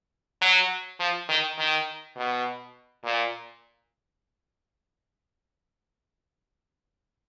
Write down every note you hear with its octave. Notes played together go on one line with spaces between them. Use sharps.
F#3
F3
D#3
D#3
B2
A#2